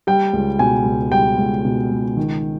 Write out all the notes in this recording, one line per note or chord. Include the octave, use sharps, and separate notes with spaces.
G3 G5
C#2
B2 G#5
C#2
G3 G5
C#2
B2
C#2
D#3